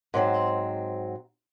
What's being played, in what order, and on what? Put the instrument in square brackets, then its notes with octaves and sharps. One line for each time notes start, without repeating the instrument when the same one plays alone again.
[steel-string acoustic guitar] G#2 F#3 C4